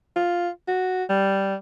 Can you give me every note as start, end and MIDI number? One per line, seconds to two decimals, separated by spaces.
0.16 0.49 65
0.68 1.04 66
1.10 1.55 55